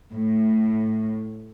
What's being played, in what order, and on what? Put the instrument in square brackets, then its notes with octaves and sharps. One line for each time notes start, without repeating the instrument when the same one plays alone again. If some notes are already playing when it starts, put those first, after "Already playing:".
[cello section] A2